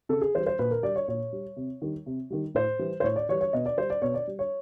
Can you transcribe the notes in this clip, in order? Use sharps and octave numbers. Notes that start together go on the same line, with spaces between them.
C#3 A4
G#4
E3 G3 C5
C5
A#2 B4
A#4
G3 D5
C#5
A#2 C#5
G3
C3
D#3 G3
C3
D#3 G3
A2 C5
E3 G3
C5
A2 C#5
D5
E3 G3 C#5
C#5
B2 D#5
D5
G3 C5
D5
B2 C#5
D5
G3
C#5